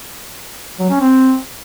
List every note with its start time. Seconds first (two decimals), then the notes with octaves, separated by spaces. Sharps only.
0.79 F#3
0.90 C#4
1.00 C4